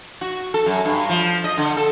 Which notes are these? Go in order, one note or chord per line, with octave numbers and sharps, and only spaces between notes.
F#4
A4
F#2
G2
F3
D#5
D3
A4